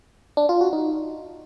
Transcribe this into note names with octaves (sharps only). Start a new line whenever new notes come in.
D4
F4
F#4
D#4